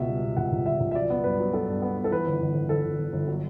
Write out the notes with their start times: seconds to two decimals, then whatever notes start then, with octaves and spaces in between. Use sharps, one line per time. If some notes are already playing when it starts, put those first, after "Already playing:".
Already playing: C#2 B2 E5
0.08 G3
0.23 B2
0.37 C#2 F#5
0.52 C#2
0.66 C#2 E5
0.80 C#2
0.91 E5
0.95 F#3 D5
1.10 B3
1.24 G2 B4
1.39 F#3
1.53 B3 A4
1.67 G2
1.82 B3
1.97 B3
2.04 A4
2.11 E3 B4
2.27 G1
2.40 G1
2.55 G1
2.69 G1 A4
2.84 G1
2.98 G1
3.13 G1
3.28 F#3